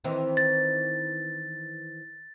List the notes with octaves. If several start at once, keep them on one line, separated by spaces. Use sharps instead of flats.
D#3 E3 C4
A6